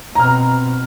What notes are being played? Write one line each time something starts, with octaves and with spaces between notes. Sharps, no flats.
B2 C4 A#5 F6